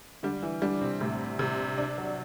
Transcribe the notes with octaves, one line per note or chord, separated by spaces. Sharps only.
D3 G3 D4
E3 E4
D3 G3 D4
C3 C4
A2 C3 A3
C3 G3
G3 D4
F#3